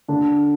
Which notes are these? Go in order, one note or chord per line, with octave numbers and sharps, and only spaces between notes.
D3 D4